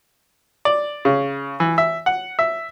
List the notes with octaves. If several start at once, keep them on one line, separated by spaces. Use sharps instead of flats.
D5
C#3
E3
E5
F#5
E5